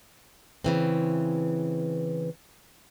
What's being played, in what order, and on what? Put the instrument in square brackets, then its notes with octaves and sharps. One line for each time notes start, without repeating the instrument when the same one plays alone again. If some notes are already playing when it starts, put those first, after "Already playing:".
[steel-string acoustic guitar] C#3 E3 C4